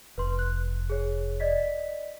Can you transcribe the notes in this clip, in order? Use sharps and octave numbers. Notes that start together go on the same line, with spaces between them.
F1 B4 C6
F#6
G#4 C#5
D5 D#5 B6